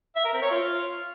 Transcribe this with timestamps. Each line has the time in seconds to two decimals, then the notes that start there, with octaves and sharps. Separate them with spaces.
0.16 E5
0.25 A#4
0.33 C4
0.42 C#5
0.51 F4